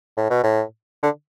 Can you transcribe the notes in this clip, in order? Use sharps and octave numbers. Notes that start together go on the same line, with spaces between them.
A2
B2
A2
D3